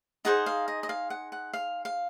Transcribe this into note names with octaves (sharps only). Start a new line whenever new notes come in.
D#4 G#4 C5 F#5
F5
D#5
D#5
F5
F#5
F#5
F5
F5